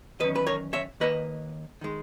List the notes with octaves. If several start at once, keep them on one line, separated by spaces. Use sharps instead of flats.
E2 D#3 F#3 C#4 B4 D#5
B4
A#4 C#5
C#5 E5
D#2 D#3 A#3 B4 D#5
D#3 G#3